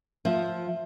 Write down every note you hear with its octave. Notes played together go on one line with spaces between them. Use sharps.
F3 E5